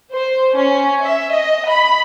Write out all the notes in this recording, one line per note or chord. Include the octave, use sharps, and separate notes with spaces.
C5
C#4
E5
D#5
B5